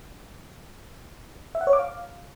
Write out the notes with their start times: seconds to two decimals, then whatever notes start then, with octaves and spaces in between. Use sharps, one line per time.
1.55 E5
1.61 F#5
1.67 C#5
1.73 D6
1.79 F5